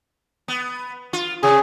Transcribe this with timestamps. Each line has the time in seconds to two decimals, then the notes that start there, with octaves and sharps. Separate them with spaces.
0.48 B3
1.13 F4
1.43 C3 G#4